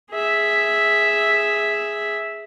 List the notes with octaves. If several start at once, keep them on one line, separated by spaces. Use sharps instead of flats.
G#4 E5